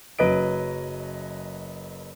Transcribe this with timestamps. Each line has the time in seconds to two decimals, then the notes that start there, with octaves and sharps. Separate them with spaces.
0.19 F#1 F#3 B4 D#5 D7